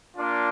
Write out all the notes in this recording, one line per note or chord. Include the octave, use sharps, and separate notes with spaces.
A#3 D4 F4